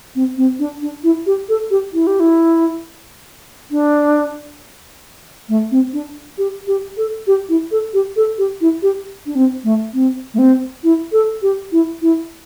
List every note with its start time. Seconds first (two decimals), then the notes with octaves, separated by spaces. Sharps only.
0.15 C4
0.37 C4
0.59 D4
0.82 D4
1.04 E4
1.26 G4
1.49 A4
1.71 G4
1.93 E4
2.07 G4
2.20 E4
3.71 D4
5.49 A3
5.71 C4
5.93 D4
6.38 G4
6.67 G4
6.97 A4
7.27 G4
7.49 E4
7.71 A4
7.94 G4
8.16 A4
8.38 G4
8.61 E4
8.82 G4
9.26 D4
9.35 C4
9.64 A3
9.93 C4
10.34 A3
10.38 C4
10.83 E4
11.12 A4
11.42 G4
11.72 E4
12.02 E4